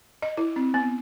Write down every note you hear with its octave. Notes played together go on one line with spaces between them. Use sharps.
D#5
E4
C4
B3